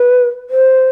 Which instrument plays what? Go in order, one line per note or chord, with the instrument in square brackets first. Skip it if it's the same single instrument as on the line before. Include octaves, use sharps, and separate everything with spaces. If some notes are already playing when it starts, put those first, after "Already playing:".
Already playing: [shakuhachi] B4
C5